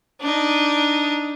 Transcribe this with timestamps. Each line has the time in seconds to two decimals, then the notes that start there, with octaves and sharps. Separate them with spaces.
0.21 D4 D#4